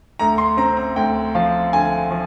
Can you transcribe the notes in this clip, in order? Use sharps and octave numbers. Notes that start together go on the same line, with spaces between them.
D2 A#5
C6
C4 A#5
A#5
D2 G5
F3 F5
D3 G#5
F3